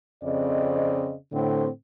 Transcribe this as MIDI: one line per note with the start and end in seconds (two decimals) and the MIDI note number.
0.23 1.14 41
0.23 1.14 49
0.23 1.14 60
0.23 1.14 74
0.23 1.14 75
1.32 1.67 45
1.32 1.67 50
1.32 1.67 60